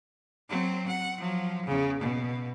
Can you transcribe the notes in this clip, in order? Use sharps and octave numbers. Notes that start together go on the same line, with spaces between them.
F#3 C4
F#5
F3 F#3
E2 C#3
B2